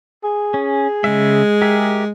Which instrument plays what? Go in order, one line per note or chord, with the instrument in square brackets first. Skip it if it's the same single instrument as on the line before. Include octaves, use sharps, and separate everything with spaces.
[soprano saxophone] G#4
[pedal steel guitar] C#4
[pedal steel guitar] C#3 E5 [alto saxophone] G#3
[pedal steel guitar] G4 A#4 E5